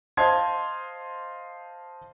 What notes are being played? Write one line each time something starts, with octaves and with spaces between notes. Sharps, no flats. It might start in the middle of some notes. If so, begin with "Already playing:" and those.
C5 D#5 F5 A5 C6 G#6